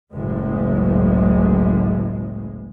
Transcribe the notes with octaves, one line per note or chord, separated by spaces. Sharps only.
F#1 C#2 A2 G#3